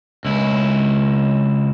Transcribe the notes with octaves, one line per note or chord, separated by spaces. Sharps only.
C#2 E4